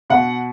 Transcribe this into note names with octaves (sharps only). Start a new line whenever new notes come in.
B2 F#5